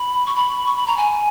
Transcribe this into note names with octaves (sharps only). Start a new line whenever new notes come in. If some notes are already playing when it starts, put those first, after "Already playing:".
Already playing: B5
C#6
B5
C#6
B5
A#5
G#5